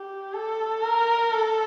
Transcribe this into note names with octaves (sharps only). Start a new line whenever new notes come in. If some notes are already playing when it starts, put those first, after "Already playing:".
Already playing: G4
A4
A#4
A4